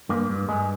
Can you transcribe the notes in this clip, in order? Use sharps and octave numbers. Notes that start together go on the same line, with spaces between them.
G2 A#3
G2
G2 G#3